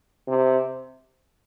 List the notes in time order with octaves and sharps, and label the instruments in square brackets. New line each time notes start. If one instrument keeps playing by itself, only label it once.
[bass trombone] C3